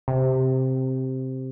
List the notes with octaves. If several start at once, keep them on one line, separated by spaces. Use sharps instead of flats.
C3